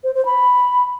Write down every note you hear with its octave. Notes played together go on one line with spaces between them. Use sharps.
C5
C5
B5